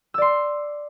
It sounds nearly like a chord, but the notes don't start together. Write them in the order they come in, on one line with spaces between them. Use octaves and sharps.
E6 D5 C6